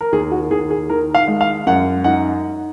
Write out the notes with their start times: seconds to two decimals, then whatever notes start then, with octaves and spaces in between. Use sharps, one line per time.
0.01 A#4
0.13 D#2 G#4
0.32 F#4
0.51 D#2 G#4
0.70 G#4
0.90 D#3 A#4
1.15 F5
1.28 G#3
1.41 F5
1.66 F#2 F#5
2.04 D#4 F#5